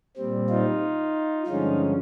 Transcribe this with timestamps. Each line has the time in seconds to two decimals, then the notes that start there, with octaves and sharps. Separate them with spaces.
0.17 A#2 G3 C4
0.50 D#4 F4
1.47 G2 D3 F3 G#3 C#4 D#4 F4